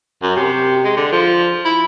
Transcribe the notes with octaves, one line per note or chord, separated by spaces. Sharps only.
F#2
C3
G#3
D3
F3
E4